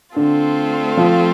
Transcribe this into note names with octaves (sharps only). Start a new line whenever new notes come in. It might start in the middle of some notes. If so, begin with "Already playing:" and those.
D3 A3 C4 F4 A4
F3